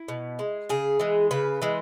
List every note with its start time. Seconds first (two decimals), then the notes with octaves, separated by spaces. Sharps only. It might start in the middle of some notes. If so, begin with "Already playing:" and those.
Already playing: E4
0.08 B2
0.39 G#3
0.69 C#3 G#4
1.00 E3 G#3
1.31 C#3 B4
1.62 E3 G#3